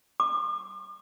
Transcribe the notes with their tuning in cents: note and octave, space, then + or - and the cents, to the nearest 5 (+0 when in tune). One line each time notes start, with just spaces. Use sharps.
D6 +45